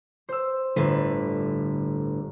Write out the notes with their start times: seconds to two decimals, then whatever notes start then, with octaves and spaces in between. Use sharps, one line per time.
0.29 C5 E6
0.76 G1 A2 D3 B4